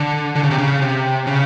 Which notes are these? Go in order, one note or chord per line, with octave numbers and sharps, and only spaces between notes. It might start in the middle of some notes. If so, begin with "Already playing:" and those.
Already playing: D3
D3
C#3
C3
C#3
C3
C#3